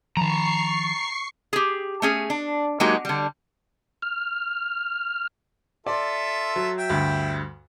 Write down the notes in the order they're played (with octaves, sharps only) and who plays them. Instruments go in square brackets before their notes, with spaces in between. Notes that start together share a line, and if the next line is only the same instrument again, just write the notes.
[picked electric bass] D#3 F3 [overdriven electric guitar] A5 A#5 [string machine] C#6 C7
[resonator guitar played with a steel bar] G4 G#4
A3 C#4 G#4
D4
F#3 G#3 A#3 D#4 F#4 G4
D3 G3
[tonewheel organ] F6
[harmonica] F4 A4 E5 [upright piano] D5
[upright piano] F#3
[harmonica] E5 G5
[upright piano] D2 G2